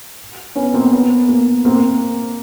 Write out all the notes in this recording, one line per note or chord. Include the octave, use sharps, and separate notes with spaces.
B3 C#4
A#3 C4
B3
A#3
A#3 C4